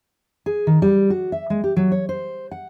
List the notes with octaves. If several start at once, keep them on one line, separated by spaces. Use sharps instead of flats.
G#4
D#3
G3
F#4
E5
G#3
G4
F#3
C#5
C5
F#5